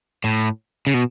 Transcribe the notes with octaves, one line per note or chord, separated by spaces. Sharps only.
A2
C#3
B2